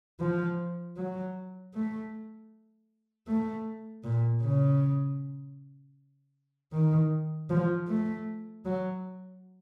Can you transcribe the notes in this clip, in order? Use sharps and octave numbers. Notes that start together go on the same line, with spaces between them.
F3
F#3
A3
A3
A#2
C#3
D#3
F3
A3
F#3